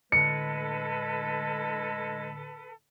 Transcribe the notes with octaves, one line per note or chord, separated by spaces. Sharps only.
A2 D3 G#3 A4 B4 C#7